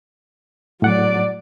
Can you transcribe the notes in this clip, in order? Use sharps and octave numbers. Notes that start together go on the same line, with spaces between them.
A2 F#3 D5 F#5